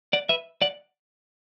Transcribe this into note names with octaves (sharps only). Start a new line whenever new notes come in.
D5 F#5
B4 E5
D5 F#5